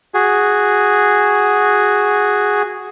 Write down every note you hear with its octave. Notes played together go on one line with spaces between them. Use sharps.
F#4 G#4